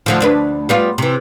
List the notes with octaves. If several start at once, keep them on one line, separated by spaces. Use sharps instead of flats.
D2 D3 F3
D2 D4 B4
G3 B3 F4
C3 E3